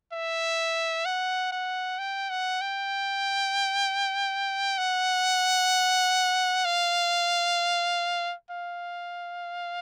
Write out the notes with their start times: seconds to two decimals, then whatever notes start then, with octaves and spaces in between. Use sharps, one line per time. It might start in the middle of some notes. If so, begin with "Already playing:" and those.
0.13 E5
1.06 F#5
1.52 F#5
1.99 G5
2.30 F#5
2.61 G5
4.78 F#5
6.65 F5
8.51 F5